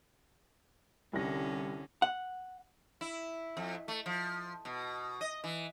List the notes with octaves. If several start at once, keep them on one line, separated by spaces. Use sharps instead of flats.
C2 D3 C#4 A#6
F#5
E4
F2
A3
F3
B2
D#5
E3